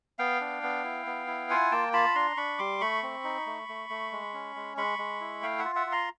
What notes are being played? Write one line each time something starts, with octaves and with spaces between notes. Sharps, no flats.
B3 F5 G5
D4
B3
E4
B3
E4
F4 F#5 G#5
A#3 G5 A5
F4 A5 B5
D4 A#5 C6
D4 B5 C#6
G3 C6 D6
A3 B5 C#6
C4
D#4
A3
A3
A3
G#3
C#4
G#3
G#3 B5 C#6
G#3
E4
A3 F5 G5
E5 F#5
F4
E5 F#5
F4
A#5 C6